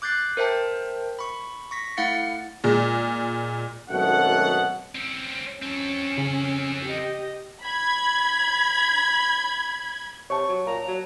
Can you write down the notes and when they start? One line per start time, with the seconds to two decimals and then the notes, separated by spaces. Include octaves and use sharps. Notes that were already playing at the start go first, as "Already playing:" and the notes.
0.02 D6 F#6 G6 A6 C7
0.37 A#4 C5 E5 G5 A5
1.19 B5 C#6
1.71 C#6 A#6 B6
1.97 A3 E4 F5 F#5 A6 C#7
2.64 A#2 G#3
3.90 G#1 F#2 B2 A3 F#5
4.95 C4 C#4
5.63 C4 C#4 A4
6.18 C#3
6.85 G4 D#5
7.63 B5 G#6
10.30 C3 C#5 A5 C#6
10.48 F#3
10.66 A#2 A#5
10.88 F#3